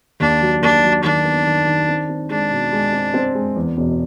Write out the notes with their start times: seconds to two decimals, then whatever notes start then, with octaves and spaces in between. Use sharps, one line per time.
0.20 D#2 D4
0.41 F#3
0.62 D#2 D4
0.83 F#3
1.03 D#3 D4
1.25 B3
1.46 D#3
1.66 D#3
1.88 C4
2.09 C4
2.30 G#3 D4
2.51 B2
2.72 G#3
2.93 C4
3.14 C4
3.35 G#3
3.56 E2
3.77 E1